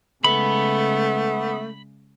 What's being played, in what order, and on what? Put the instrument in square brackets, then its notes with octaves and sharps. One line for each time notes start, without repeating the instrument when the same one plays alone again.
[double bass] C#3 G#3 [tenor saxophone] A3 [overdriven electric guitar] B3 [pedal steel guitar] B5